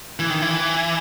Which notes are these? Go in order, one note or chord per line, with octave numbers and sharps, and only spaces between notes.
E3
D#3
E3